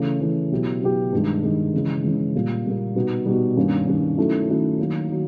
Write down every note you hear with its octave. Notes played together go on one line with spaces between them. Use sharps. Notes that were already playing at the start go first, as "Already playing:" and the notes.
Already playing: C#3 E3 A3
C#3 E3 A3
B2 F#3 B3 E4 G4
B2 F#3 B3 E4 G4
G2 D#3 G#3
G2 D#3 G#3
C#3 E3 G#3
C#3 E3 G#3
A#2 G3 A#3
A#2 G3 A#3
B2 G3 B3 D#4 F#4
B2 G3 B3 D#4 F#4
G2 D#3 G3 A#3 C#4
G2 D#3 G3 A#3 C#4
D#3 F#3 A3 C#4 E4
D#3 F#3 A3 C#4 E4
D#3 F#3 A#3
D#3 F#3